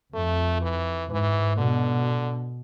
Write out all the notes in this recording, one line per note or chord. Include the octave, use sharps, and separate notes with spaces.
F2 A3
E3
G#2 E3
B2 D3